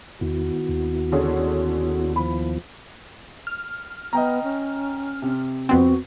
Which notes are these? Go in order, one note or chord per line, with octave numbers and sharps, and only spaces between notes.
E2 D#3 B3 E4 F#4
D#2
D3 C#4 G#4
F3 B5
F6
B3 D#5 G5 A#5
C#4
C3
F2 B3 C4 F#4